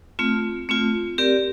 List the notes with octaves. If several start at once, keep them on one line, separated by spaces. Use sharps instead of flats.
A3 C4 F4
A3 C4 F4
C4 G4 A#4 D5